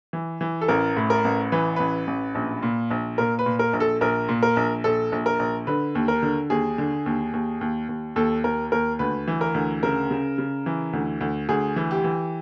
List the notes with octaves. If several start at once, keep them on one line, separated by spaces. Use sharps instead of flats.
E3
E3
A4
A1 A#4
A2
A#4
A1
E3 B4
A1 B4
A1
A#1
A#2
A#1
A#2 A#4
B4
A#2
A#4
A#1
A4
A#1 A#4
A#2
A#4
A#1
A#1 A4
A#1
A#4
A#1
D3 B4
D#2
A#4
D3
D#2 G#4
D3
D#2
D#2
D#2
D#2
D#2 A4
D#2 A#4
D#2 A#4
D2 B4
E3
A#4
D2
C#3 A#4
C#3
C#3
E3
D2
D2
D2 G#4
E3
G4
E3